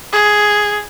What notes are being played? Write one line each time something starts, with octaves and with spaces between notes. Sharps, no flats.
G#4